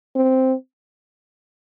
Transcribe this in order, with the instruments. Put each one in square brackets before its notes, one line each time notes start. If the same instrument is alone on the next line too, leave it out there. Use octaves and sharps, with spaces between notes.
[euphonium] C4